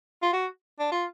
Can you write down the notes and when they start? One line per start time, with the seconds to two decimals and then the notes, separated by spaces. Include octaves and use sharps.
0.22 F4
0.33 F#4
0.79 D4
0.92 F4